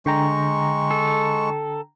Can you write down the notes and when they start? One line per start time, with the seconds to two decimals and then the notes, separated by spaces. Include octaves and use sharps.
0.06 D3 G#3 G5 A#5 C#6
0.91 A4